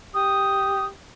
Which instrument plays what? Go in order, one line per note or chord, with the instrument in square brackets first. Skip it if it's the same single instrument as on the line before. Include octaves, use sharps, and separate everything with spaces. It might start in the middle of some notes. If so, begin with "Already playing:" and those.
[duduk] G4 [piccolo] D#6